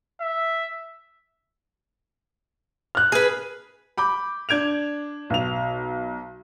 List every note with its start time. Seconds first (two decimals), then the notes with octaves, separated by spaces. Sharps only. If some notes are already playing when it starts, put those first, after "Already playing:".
0.21 E5
2.95 F6 F#6
3.12 G#4 B4
3.98 B5 D6 G6
4.49 D4 G#6 D7 F7
5.30 B1 F7